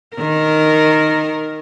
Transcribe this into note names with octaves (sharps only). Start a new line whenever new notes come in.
D#3 A#4